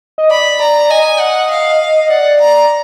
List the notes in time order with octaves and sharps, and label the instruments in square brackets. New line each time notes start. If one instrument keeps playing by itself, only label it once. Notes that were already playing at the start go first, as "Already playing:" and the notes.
[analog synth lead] D#5
[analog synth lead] D5 [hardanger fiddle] B5
[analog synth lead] D5 [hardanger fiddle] A#5
[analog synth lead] D#5 [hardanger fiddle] G#5
[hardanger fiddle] F#5
F5
[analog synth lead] D5 [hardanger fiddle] F#5
[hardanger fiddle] A#5